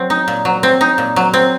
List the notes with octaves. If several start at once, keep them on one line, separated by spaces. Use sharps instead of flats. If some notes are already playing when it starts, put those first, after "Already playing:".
Already playing: F#3 C4
D#4
A#2
F#3
C4
D#4
A#2
F#3
C4